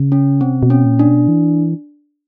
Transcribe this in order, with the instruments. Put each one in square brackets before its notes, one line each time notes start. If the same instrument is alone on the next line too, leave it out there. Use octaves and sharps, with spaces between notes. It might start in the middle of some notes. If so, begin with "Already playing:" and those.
Already playing: [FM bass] C#3
[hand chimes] C#4
[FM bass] C3 [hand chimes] C4
[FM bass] B2
[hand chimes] C#4
[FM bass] A#2
[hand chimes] D4
[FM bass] B2
E3